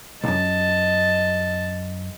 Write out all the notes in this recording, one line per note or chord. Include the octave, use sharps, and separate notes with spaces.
B1 F#2 D#5 A5